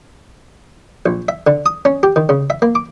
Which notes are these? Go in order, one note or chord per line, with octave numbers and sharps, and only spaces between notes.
A#1
E5
D3
D#6
C#4
G4
D#3
C#3
E5
A#3
D6